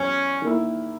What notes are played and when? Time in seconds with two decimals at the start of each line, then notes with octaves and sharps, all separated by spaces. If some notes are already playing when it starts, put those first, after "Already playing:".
Already playing: E2 F#3 C#4
0.42 D#3 A#3 E4